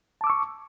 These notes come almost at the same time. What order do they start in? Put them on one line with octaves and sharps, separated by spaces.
A5 D6 E6 C#6